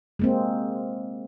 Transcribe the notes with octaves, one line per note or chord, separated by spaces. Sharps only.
G#3 A#3 C4